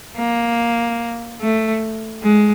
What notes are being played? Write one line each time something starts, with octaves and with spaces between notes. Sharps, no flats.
A#3
A3
G#3